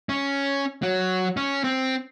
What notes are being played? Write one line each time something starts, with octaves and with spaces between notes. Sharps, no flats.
C#4
F#3
C#4
C4